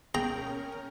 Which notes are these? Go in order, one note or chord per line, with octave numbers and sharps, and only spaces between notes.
C#4 G#4 A#4 G5 A#5